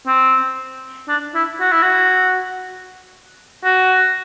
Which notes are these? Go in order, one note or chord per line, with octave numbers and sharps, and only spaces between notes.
C4
D4
E4
F#4
E4
F#4
F#4